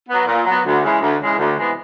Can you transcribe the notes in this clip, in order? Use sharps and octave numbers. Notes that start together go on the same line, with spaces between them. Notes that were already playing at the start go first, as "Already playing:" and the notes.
F#3 B3
A#2
F#3 B3
D2
C#3 E3 G#3
D2
C#3 E3 G#3
D2
C3 E3 G#3 B3